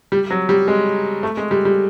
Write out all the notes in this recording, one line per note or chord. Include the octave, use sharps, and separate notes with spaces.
G3
F#3
G3
G#3
A3
G#3
G3
G3